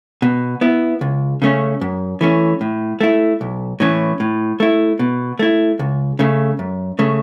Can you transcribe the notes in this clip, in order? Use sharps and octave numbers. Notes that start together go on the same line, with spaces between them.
B2
B3 E4
C#2
C#3 A3 C#4
F#2
E3 A3 C#4
A2
A3 E4
B1
A2 E3 C#4
A2
A3 E4
B2
A3 E4
C#2
C#3 A3
F#2
C#3 A3